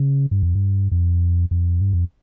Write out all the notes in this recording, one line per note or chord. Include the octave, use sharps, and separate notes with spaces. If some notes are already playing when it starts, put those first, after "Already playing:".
Already playing: C#3
G2
F2
G2
F2
F2
G2
F2